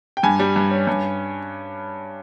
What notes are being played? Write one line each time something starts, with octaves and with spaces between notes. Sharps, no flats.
G5
G2 G#5
G3
G2
C#4
G2